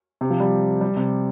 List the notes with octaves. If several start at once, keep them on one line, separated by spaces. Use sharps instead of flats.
C3
F3
G3
G3
C3